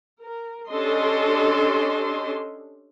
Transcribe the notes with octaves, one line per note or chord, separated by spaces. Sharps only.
A#4
C#4 D4 G4 A4 D#5 C6